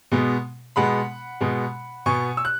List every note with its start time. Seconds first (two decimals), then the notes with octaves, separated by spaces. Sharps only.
0.12 B2 G#3 B3
0.76 B2 G#3 B3 F#5 B5
1.41 B2 G#3 B3
2.06 B2 B3 G#5 C#6
2.37 E6
2.45 F#6